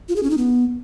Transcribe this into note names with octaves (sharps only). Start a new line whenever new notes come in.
F4
G#4
C#4
D#4
B3